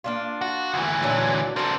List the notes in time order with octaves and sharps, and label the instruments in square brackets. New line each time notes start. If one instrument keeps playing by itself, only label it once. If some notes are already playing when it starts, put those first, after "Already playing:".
[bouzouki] A#3 D4 F4
[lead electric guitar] F#4
D2 E3
[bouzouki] A#2 F#3 D4
[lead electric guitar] C4 D4 [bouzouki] A4 A#4